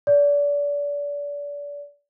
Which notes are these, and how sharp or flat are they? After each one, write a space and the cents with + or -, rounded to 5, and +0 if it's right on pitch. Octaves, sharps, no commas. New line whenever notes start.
D5 -30